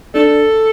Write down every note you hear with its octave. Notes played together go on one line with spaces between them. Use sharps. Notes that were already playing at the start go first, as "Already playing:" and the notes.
D4 A4